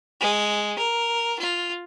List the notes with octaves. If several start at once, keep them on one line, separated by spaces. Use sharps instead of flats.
G#3
A#4
F4